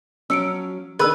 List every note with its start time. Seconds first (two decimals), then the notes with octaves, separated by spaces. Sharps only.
0.30 F3 F#3 C#4 E6 C#7 D7
0.99 D#3 B3 D4 G#4 B4 E6